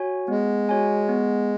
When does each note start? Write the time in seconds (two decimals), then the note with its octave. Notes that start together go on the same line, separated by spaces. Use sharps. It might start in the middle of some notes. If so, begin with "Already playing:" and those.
Already playing: F#4 C#5 G#5
0.28 G#3 B3
0.69 F#4 C#5 G#5
1.09 B3